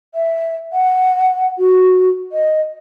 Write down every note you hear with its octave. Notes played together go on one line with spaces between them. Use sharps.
E5
F#5
F#4
D#5